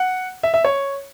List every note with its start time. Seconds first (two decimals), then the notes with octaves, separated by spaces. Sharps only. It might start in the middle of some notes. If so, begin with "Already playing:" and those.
Already playing: F#5
0.43 E5
0.54 E5
0.64 C#5